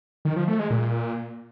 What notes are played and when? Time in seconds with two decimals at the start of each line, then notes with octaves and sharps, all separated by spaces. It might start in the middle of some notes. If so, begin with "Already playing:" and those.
0.25 D#3
0.36 F3
0.48 A3
0.59 G#3
0.70 A#2